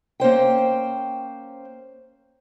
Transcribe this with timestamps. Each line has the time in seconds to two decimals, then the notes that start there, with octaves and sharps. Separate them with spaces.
0.20 A#3 C#4 C5 G5